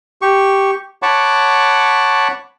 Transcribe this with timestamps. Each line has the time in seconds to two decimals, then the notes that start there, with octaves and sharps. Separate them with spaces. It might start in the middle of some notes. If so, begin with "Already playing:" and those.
0.22 G4 C#6
1.02 C#5 F#5 A5 B5 C#6 D6